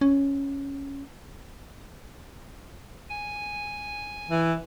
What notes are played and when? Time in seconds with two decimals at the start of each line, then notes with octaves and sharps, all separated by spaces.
0.01 C#4
3.10 G#5
4.29 E3